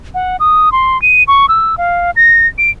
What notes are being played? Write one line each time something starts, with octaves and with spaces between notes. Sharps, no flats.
F#5
D#6
C6
D#7
C#6
E6
F5
A#6
D7